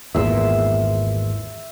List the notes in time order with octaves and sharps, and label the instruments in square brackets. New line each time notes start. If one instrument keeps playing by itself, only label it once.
[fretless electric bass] G#1 E2 A#2 [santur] E5 C6 E6